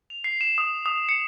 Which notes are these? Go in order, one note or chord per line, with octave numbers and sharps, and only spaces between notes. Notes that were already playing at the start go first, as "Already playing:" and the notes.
F7
C7
E7
D#6
D#6
C#7